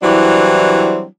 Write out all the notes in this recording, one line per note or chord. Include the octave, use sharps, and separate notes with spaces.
E3 F#3 G3 C4 D4 E4